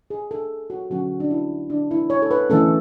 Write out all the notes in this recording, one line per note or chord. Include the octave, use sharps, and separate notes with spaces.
G#4
A4
F#4
D3 F#3 C#4 F#4
D4
E4
D4
E4
C#5
A4
B4
E3 A3 C#4 A4